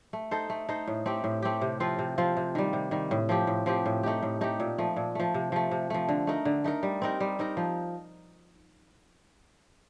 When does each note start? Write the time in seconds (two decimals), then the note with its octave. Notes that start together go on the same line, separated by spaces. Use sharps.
0.13 A3
0.31 D#4 A4 C5
0.50 A3
0.69 D#4 A4 C5
0.87 A2
1.06 A3 C4 G4
1.24 A2
1.42 A3 C4 G4
1.61 C3
1.80 F3 C4 F4
1.99 C3
2.18 F3 C4 F4
2.37 C3
2.55 D#3 G3
2.73 C3
2.91 D#3 G3
3.11 A2
3.29 F3 C4 G4
3.47 A2
3.66 F3 C4 G4
3.86 A2
4.03 A3 D#4 G4
4.23 A2
4.41 A3 D#4 G4
4.60 A#2
4.78 F3 A3
4.96 A#2
5.15 F3 A3
5.34 C3
5.52 F3 A3
5.71 C3
5.90 F3 A3
6.08 D3
6.27 A3 D#4 A#4
6.45 D3
6.64 A3 D#4 A#4
6.83 G3
7.02 C4 D#4 A#4
7.20 G3
7.39 C4 D#4 A#4
7.57 F3